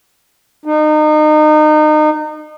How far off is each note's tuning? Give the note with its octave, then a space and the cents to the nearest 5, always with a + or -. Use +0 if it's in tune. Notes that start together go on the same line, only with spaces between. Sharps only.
D#4 -30